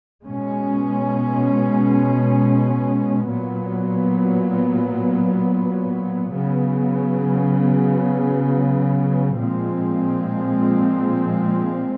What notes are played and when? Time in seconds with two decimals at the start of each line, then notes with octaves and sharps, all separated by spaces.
0.24 B2 G#3 C#4
3.28 A#2 F#3 B3
6.32 C#3 F#3 B3
9.36 A#2 F3 G#3 C4